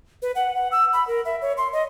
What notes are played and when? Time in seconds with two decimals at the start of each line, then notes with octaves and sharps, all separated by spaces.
0.22 B4
0.35 F#5
0.55 F#5
0.72 E6
0.93 B5
1.07 A#4
1.25 E5
1.41 C#5
1.57 C6
1.73 D#5